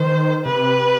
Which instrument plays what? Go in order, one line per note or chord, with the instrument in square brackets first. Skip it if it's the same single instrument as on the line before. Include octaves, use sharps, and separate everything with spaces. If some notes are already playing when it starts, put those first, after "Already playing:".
Already playing: [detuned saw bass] D#3 [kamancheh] C5
[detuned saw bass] C3 [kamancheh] B4